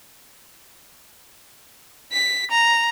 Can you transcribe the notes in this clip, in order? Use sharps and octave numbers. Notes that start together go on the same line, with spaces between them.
B6
A#5